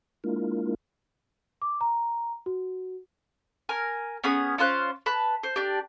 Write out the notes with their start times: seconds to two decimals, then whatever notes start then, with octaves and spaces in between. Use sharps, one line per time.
0.24 G#3 A#3 D4 E4 F4 A#4
1.62 D6
1.81 A#5
2.46 F#4
3.69 A#4 G#5 F6
4.24 B3 C#4 G#4 D#6
4.58 C#4 F4 C5 F#6
5.06 B4 A5
5.43 C5
5.56 D4 G4